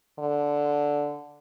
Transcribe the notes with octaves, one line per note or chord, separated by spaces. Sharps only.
D3